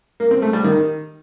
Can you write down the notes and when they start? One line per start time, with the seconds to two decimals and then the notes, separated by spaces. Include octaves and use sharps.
0.20 A#3
0.31 C4
0.42 A3
0.53 G3
0.64 D#3